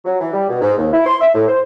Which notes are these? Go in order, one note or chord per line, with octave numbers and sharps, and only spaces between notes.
F#3
E3
G3
B2
G#2
D#2
E4
C6
E5
A2
C5